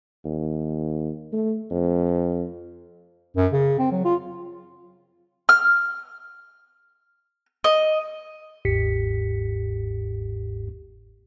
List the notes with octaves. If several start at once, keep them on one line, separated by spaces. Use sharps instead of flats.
D#2
A3
F2
F#2
C#3
C4
F#3
F4
F6
D#5
G1 D#2 G#2 G4 B6 C#7